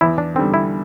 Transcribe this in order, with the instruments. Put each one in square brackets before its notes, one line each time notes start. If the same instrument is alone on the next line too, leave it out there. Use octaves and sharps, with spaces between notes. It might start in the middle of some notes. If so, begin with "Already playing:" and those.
[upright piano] E2 [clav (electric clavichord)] E4
[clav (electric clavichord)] D4
[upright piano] D3 G3 [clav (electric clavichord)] C4
[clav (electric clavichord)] E4